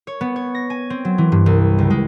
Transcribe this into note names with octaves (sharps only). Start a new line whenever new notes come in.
C#5
B3
C#5
A#6
G#5
C4
F#3
E3
G2
C2
C#2
G#3